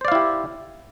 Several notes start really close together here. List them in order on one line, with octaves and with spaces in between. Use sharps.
C5 D5 F5 E4 G4